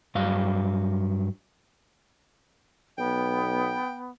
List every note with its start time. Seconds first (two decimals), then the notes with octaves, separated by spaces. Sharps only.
0.15 G2 F#3 F5
2.98 B1 B3 G5